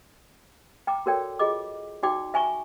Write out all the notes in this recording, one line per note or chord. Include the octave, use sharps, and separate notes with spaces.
G5 A#5 D6
F#4 A4 A#4 C#5 D5 G5
F4 G#4 D#5 D6
D#4 F#4 D5 G5 D6
E5 G#5 A#5 C#6